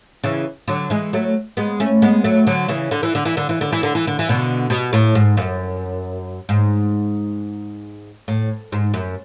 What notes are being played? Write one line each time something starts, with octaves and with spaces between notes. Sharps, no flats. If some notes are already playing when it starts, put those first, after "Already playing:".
C#3 E3
D3 F#3
E3 G#3
F#3 A3
G#3 B3
A3 C#4
G#3 B3
F#3 A3
D3 F#3
C#3 E3
D3
E3
D3
E3
D3
E3
D3
E3
D3
E3
D3
E3
B2 D3
B2
A2
G#2
F#2
G#2
A2
G#2
F#2